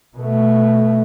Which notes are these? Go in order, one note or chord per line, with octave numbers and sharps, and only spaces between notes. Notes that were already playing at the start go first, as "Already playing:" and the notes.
B2 A3